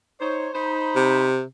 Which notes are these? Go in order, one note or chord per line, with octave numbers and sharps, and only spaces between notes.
D#4 C5 C#5
D#4 C5 B5
C3